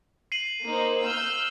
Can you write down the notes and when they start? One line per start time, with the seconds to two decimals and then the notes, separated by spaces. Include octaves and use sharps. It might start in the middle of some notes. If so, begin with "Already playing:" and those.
0.32 C7 D#7 F#7
0.64 A#3 D#4 C5
1.02 E6 F6 G6